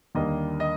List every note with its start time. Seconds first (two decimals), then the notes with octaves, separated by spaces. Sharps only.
0.15 D#2 D3 G3 A#3 D#5
0.60 D#5